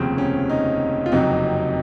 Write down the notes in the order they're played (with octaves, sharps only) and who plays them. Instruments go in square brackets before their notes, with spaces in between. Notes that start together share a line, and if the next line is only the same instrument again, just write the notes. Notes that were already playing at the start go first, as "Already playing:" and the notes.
Already playing: [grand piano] F1 D#2 C#3 F3 C4
C#4
D#4
F4
F#1 F2 C3 F#3 D#4